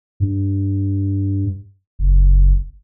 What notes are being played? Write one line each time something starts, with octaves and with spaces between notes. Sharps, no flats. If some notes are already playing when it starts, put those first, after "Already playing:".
G2
F#1